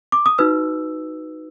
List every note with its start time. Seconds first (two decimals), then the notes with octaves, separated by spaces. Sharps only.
0.12 D6
0.26 D#6
0.38 D#4 F#4 B4 E6